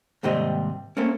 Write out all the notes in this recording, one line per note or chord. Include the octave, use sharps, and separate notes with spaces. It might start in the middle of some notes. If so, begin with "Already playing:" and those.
D#2 G#2 C3 G3 C4 D#5
A3 A#3 C4 C#4